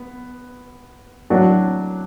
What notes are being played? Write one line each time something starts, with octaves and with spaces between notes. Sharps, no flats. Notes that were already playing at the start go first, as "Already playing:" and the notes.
Already playing: B3
A2 F#3 D4 F#4